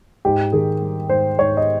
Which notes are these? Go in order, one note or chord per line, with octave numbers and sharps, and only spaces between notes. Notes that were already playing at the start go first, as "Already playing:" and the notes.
G#2 G4
D#3 G#4
G3
G#2 C5
G#2 C#5
D#5